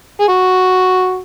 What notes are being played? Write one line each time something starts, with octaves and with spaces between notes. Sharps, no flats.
G#4
F#4